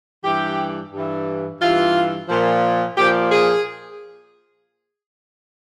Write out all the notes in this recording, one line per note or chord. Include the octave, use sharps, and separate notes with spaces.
G2 E3 G4
G2
E3
G2 E3 F4
A#2 F3
A#2 F3 G4
G#4